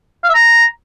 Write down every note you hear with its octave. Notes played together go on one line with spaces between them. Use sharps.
F5
E5
A#5